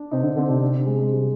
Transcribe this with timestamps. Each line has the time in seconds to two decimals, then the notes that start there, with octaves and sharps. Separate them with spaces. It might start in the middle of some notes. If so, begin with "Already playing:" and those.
Already playing: D4
0.11 C3 D#4
0.18 C4
0.23 D3 D4
0.36 D3 C4
0.49 C3 D4
0.61 D4
0.74 D4
0.86 G#3
0.99 G#3
1.12 G3